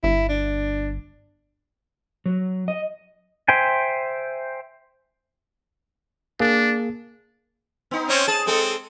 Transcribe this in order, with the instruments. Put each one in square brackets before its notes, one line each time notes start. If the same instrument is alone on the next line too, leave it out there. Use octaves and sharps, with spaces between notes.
[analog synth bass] G1 [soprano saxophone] E4
[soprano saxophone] D4
[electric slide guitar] F#3
D#5
[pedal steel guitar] C5 E5 G5 G#5
[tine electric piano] A#3 G#4 [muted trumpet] D4
[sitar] B3 D#4
[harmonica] C4 C#4 [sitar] C5 C#5
[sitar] G#4 [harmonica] A5
[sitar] G#3 G#4 A4 [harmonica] C4